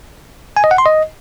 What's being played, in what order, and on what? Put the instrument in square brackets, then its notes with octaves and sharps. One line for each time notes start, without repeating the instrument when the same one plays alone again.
[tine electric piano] G#5
D#5
F#5
C6
D#5